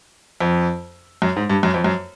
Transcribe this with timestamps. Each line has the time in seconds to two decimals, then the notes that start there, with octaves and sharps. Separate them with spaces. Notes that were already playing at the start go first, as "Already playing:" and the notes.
0.40 F2
1.22 F#2
1.36 G#2
1.50 G2
1.63 F#2
1.74 F2
1.84 F#2